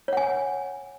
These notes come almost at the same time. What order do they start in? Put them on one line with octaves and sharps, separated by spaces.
C#5 F#5 G#5